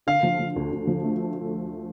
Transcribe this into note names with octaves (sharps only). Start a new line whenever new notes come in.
D3 F5
F3
F3
D2
D2
F3
A3